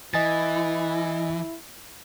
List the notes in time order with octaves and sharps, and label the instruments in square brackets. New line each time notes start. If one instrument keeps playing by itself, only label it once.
[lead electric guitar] E3 [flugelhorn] E4 [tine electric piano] D#5 G#5 A6